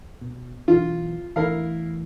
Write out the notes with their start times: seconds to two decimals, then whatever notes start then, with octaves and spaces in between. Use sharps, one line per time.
0.21 B2
0.68 B1 E2 E3 F4
1.36 E2 A2 E3 E4 A#4 F5